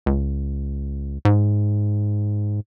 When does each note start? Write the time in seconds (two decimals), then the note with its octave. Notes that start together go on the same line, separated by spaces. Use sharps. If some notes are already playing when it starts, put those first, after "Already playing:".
0.06 C#2
1.25 G#2